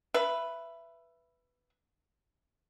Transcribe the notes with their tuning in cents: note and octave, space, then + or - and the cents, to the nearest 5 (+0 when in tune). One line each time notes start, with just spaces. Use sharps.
B4 +0 E5 +20